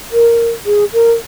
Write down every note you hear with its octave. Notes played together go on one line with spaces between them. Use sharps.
A#4
G#4
A#4